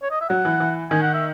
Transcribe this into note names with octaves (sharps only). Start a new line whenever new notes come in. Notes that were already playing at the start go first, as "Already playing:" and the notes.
C#5
D#5
E5
F#3 F#5
E3
E3
D#3 G#5
F#5
E5